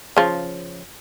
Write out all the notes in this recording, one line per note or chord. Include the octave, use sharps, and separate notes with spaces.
C#3 F3